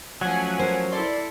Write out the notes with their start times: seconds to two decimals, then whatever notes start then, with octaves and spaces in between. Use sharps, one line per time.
0.21 F3 F#3 A3 C#4 F#5 G#5
0.59 A#4 C5
0.92 E4 A4 D5 C6